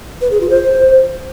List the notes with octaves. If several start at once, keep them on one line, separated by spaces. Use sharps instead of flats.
B4
G#4
F4
C5